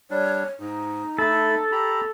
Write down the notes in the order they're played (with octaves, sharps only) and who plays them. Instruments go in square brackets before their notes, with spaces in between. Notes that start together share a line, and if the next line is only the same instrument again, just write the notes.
[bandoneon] G3 D4 [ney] C#5
[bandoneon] G#2 [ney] D#4
[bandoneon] A3 B5 [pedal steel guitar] A4
[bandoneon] G4 A#5 B5